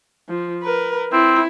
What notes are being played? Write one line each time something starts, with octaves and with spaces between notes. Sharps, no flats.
F3
A#4 B4
C4 E4